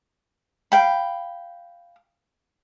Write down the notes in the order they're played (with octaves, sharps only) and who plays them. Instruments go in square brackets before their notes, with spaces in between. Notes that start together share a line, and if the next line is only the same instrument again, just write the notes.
[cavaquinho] F5 G5 B5